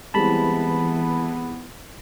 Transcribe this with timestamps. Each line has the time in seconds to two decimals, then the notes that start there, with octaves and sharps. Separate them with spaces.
0.14 E3 G3 G#3 B3 C4 A5 B5